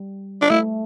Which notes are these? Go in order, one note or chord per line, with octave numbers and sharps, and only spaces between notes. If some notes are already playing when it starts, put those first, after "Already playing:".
Already playing: G3
D4
A3 E4